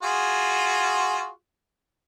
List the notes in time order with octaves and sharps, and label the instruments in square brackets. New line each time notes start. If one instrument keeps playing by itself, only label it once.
[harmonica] F4 F#4 G#4